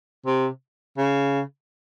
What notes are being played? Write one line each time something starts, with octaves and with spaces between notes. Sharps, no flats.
C3
C#3